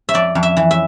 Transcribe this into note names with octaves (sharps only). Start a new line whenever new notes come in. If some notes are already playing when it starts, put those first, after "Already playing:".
E5
F2 D5
F2
E5
E3
E5